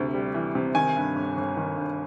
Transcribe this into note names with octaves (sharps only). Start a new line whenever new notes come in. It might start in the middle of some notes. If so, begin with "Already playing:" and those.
Already playing: D2 C3
G3
E3
C3
D#3 G#5
G2
G1
G1
D#3
G2